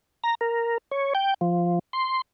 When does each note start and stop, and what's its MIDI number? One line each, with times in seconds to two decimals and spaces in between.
0.24 0.35 82
0.41 0.78 70
0.92 1.13 73
1.15 1.34 79
1.41 1.79 53
1.93 2.22 84